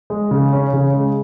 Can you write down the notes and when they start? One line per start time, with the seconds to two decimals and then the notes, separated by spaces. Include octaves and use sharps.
0.10 G#3
0.31 C#3
0.53 C#4
0.73 C#3
0.93 G#3